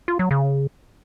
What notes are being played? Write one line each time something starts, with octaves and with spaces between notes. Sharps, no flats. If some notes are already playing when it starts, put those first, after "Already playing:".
F4
F#3
C#3